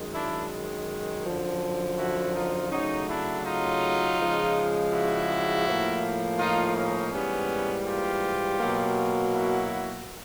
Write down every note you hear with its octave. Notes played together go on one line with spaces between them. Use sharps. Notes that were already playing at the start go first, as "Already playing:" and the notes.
Already playing: F#2 D#3 G#3
D4 E4
F#2 D3 F3
E4 F#4
D#4 F4
C#3 F#3 A3 C#4 D#4
D4 E4
D#4 F4
C#3 F3 G#3
E4 F#4
A2 F3 A#3
D#4 F4
C#4 D#4
G#2 E3 G3 A#3 B3 C#4
F4 G4
B2 F#3 A#3
E4 F#4